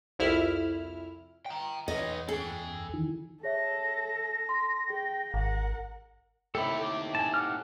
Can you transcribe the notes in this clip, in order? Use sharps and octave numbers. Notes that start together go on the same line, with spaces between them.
C2 F2 E4 F6
G5 A#5
E2 B3 C#5 D#5
G#4 A4 G5
D#3 E3
G#4 A4 C#5 E5 A#6
C6
G#4 G5
G#1 A#4 F#5
A2 C3 D#4 G4 A4 B5
D6
G#5 A5 A6
F#5 D6 F6